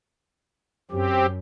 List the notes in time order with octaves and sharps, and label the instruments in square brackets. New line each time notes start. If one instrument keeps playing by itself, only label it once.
[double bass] F#2 [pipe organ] C4 G4